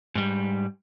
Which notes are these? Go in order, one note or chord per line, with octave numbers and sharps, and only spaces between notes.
G#2 G3